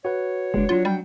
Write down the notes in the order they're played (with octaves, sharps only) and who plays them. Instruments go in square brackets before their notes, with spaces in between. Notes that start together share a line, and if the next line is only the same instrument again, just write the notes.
[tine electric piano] F#4 B4 F#5 [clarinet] C#5
[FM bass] F#1 [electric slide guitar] G#3 D4
[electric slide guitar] F#3 D4 F#4 [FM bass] F4
[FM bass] G3 [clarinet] G5